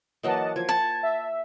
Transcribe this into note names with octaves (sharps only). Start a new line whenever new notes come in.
E3 F#3 A#3 D#5 F#5 A5
F3 G#6
F#5 A5
E5